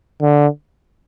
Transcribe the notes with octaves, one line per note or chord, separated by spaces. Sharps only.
D3